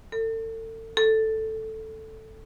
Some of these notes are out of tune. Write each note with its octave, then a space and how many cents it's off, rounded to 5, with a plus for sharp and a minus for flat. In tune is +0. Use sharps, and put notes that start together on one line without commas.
A4 +35
A4 +0